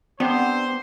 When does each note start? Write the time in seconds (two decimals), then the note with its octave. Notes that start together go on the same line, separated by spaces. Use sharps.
0.20 B3 C4 D4 G4 C5